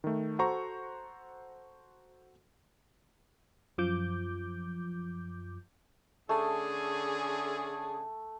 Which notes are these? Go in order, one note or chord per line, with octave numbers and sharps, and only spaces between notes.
D#3 A3
F#4 A4 C5 F#5 A#5 C#6
F#2 F3 D6 G6
D3 A3 C#4 G#4